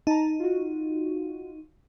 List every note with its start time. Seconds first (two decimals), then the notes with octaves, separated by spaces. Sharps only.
0.07 D#4 A5 A#5
0.40 F4 F#4